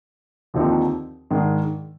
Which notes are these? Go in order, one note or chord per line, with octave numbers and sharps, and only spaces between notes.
D#2 D3 F3 C4 D#4
G#2 D#3 G#3 D4